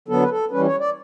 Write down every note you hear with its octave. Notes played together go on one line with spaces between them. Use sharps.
D3 F#3 B3 A4
B4
A4
E3 G3 C#4 B4
C#5
D5